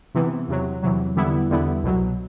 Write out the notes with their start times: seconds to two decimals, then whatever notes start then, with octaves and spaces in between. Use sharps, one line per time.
0.15 C3 E3 B3
0.48 E2 C3 F#3
0.82 E2 C3 F#3
1.16 E2 D3 G3 B3 E4
1.49 E2 D3 G3 B3 E4
1.83 C2 B2 F#3